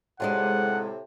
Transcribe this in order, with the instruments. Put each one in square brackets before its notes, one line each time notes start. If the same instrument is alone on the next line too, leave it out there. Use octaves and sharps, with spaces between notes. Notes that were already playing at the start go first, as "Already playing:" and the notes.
[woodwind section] A2 C3 [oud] G#3 D4 F4 [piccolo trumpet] F#5